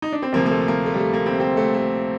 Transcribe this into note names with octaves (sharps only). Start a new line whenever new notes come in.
D#4
D4
C4
D2 C3 F3 A#3
A#3
A3
A#3
A3
G3
A3
A#3
C4
C4
A3
A3